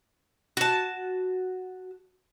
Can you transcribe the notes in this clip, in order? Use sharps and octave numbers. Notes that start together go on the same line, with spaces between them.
F#4 A5